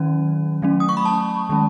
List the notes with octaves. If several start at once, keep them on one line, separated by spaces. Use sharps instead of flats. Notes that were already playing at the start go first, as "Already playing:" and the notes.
Already playing: D#3 F#3 C#4
F#3 A3 C#4
D#6
C#6
B5
A5
D#3 G#3 C#4